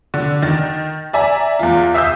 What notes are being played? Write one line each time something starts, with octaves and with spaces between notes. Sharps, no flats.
D3
D#3 A6
D5 E5 G#5 A#5
E2 F4
E5 F5 D#6 E6 G6